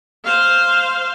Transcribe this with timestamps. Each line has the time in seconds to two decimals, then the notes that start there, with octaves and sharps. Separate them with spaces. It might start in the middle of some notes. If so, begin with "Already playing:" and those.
0.24 C5 F5